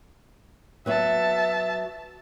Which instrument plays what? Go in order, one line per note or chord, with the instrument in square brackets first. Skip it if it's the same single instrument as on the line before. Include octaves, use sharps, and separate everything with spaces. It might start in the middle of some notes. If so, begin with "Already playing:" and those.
[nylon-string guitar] F#3 B3 F#4 [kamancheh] E5 A5